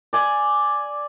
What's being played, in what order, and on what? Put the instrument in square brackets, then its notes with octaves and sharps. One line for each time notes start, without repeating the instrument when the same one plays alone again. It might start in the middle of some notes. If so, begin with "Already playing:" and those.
[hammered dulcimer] D5 G#5